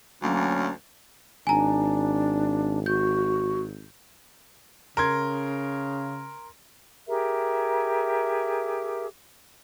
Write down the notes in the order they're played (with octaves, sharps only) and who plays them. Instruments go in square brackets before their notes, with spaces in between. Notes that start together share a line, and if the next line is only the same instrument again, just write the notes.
[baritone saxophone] D2 [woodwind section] F#3 A#3 C#4
[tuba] G#1 [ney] D4 [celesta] G#5 A#5
[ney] F#4 [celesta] G6
[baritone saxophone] C#3 [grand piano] A#4 C6 G#6
[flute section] G4 G#4 A#4 E5